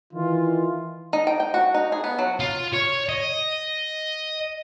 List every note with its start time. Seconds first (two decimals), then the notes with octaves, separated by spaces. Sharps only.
0.13 D#3 E3 F4
1.13 D#4
1.27 G5
1.40 G5
1.54 F#4
1.74 D#4
1.92 G#4
2.04 B3
2.19 F#3
2.40 F4
2.73 C#5
3.09 D#5